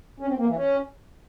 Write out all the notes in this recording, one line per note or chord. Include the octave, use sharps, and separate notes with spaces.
C#4
C4
A#3
E3
C#4